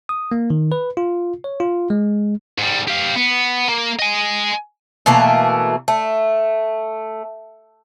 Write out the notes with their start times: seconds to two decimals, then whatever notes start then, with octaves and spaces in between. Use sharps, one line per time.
0.09 D#6
0.32 A#3
0.50 D#3
0.72 B4
0.97 F4
1.44 C#5
1.60 F4
1.90 G#3
2.58 G#2 G3
2.88 G4 F5
3.16 B3
3.68 A#3
3.99 D#5 G#5
5.06 B2 E3 A3 A#3
5.88 A3